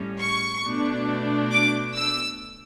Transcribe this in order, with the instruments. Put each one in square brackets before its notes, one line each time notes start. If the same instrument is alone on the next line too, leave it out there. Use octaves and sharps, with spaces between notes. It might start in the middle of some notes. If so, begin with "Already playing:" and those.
Already playing: [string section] A2 G3 C#4
C#6
B2 A3 D4
D6
E6